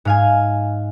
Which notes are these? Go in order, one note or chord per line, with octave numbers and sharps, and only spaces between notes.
G#2 F5 G#5